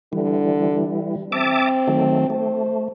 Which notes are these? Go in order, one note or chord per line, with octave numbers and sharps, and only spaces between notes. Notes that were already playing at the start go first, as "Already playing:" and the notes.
D3 E3 G3
C4 E5 A5 D6
D#3 F#3 A3
A3 C5